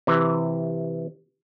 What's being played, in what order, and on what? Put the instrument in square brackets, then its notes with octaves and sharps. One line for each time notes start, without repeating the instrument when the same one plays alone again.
[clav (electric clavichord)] C3 E3